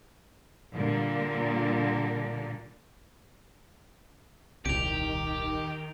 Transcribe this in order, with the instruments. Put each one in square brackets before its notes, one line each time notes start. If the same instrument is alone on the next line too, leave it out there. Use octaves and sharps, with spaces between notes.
[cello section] A#2 D3 G3 A#3
[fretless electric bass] D#1 C2 [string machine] D#3 [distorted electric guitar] G4 [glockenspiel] D7 F7